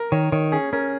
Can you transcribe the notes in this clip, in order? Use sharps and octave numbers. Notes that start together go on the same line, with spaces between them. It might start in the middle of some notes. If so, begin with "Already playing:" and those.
Already playing: A#4
D#3 C#5
D#3 C#5
C#4 G#4
C#4 A#4